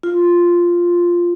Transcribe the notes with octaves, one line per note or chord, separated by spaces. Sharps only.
F4